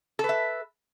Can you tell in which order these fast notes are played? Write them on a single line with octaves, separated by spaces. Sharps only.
A4 B4 E5